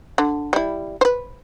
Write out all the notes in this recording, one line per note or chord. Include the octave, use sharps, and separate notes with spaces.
D3
G3 E4
B4 C5